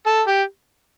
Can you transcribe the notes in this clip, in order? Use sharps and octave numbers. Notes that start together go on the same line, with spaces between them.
A4
G4